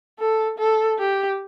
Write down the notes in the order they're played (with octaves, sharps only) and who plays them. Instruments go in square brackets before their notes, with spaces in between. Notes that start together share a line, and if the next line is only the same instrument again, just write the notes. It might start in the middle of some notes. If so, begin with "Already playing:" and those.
[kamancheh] A4
A4
G4